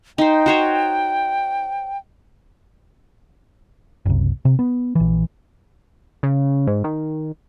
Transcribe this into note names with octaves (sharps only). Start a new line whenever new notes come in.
D#4 C5 G5
F#4 C5 C#5
F#1 C2
C3
B3
A#1 E3
C#3
G#2
D#3